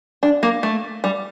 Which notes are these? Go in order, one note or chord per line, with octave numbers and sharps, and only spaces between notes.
D4
A#3
A3
G3